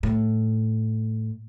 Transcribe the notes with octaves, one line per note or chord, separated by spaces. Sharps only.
A2